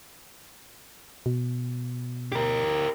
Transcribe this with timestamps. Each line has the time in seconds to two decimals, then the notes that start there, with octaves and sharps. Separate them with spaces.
1.26 B2
2.32 G4 A#4